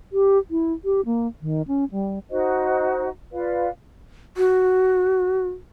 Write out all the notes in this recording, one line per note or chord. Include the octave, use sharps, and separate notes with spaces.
G4
E4
G4
A#3
D#3
C#4
G3
D#4 F#4 C5 D#5
F4 B4 D5 F5
F#4